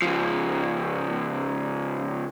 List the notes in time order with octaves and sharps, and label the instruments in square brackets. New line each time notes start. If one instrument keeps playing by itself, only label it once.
[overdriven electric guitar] C#2 F3